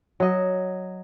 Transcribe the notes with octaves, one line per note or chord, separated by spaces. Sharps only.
F#3 D#5